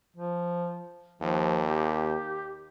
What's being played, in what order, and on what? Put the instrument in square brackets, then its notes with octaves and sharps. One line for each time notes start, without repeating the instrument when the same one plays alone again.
[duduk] F3
[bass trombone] D#2 [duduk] F3
[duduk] G4